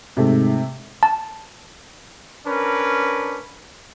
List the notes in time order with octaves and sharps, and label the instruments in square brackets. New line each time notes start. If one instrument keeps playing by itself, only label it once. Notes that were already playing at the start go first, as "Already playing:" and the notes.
[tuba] G#2 [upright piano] C3 A3
[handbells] A5
[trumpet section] C#4 D4 A#4 B4